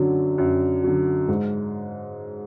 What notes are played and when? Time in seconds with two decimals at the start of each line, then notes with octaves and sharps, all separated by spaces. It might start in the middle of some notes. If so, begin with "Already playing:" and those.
Already playing: F#2 D3 F#3
0.38 F#2
0.84 D3 F#3
1.29 G#2